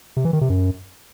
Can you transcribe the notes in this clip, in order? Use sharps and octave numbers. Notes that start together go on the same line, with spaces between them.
C3
E3
D#3
C3
F#2